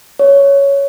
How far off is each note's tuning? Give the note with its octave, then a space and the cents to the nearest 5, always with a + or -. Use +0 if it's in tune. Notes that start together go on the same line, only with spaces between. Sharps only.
C#5 +10